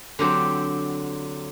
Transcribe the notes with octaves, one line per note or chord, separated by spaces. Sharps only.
D3 F#3 C4 G4